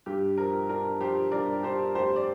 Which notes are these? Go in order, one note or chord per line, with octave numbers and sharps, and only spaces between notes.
G2 G4
F3 A#4
D4 A#4
F3 G4 C5
G2 A#4 D5
D4 G4 C5
F1 G4 C5
D5